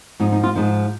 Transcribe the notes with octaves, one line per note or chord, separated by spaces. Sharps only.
G#2 F3 D#4
D#4
F4
G#2 F3 D#4